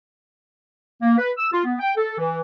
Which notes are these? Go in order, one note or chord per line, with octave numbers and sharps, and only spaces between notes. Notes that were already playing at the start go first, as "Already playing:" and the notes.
A#3
B4
E6
F4
B3
G5
A4
E3